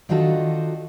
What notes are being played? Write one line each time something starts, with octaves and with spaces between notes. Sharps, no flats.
D#3 D4 D#4 F4 F#4 A4